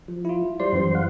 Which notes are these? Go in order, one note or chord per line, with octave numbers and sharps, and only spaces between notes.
F3
E4 F4
G3 C5 D5 C6
F#2 E3
F5 F#5